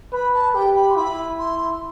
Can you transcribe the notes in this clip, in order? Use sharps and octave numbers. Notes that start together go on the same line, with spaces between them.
B4 B5
A5
G4 G5
B5
C6
E4 B5
C6